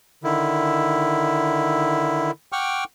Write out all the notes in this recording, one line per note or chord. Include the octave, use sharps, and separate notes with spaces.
D3 D#3 E4
F#5 G5 C#6 D6 F6